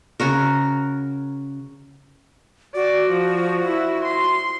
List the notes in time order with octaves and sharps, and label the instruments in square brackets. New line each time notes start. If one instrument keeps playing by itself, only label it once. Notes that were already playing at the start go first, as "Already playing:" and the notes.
[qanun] C#3 F#4 A#4
[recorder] F#4 [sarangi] D5
[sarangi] F3
E4
C6